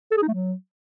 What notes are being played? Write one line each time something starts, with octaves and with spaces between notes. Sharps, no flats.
A4
G#4
D#4
A3
F#3